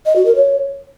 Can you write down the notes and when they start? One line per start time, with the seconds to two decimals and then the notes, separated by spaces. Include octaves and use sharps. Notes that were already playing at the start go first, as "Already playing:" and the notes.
0.06 D#5
0.16 F#4
0.26 A#4
0.35 C#5